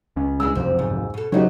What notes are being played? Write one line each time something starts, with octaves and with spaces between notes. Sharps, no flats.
C#2 C#4
G#3 D4 E4 E6
F#1 C2 F2 C4
G#2
B2 A4
C#3 F#3 A3 B3 C4 D#4 G4